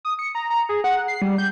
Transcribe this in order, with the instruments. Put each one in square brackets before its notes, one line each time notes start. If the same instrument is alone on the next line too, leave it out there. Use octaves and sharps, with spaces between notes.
[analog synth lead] D#6
C#7
A#5
A#5
G#4
F#5
C7
G3
G6